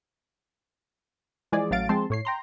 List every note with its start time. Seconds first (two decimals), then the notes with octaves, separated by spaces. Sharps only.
1.52 E3 F3 G#3 G#4 D5
1.71 A1 F#3 A3 F5 A6 D7
1.89 F3 G#3 C4 A5 C6
2.10 A2 C#5 C7
2.25 G5 A#5 C6